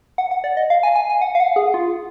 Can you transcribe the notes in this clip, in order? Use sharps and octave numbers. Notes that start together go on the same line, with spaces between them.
F#5
F#5
D5
D#5
F5
G#5
G#5
G#5
F#5
F5
F#5
G#4
F4